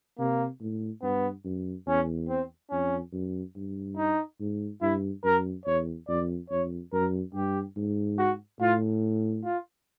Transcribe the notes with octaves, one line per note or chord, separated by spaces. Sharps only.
C3 A#3
A2
G2 B3
F#2
E2 C#4
C4
F2 C#4
F#2
G2
D#4
G#2
G2 E4
F#2 A#4
E2 C#5
F2 D5
F2 C#5
F#2 A#4
G2 G4
G#2
F#4
A2 F4
F4